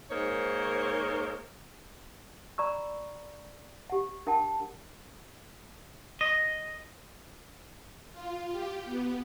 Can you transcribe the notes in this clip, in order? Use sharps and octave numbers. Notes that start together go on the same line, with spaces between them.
G#2 A#3 D#4 A#4 C5 C#5
D5 A#5 B5 C#6 E6
G4 F#5
D4 A#4 F#5 G5 A5
D#5
F4
G4
B3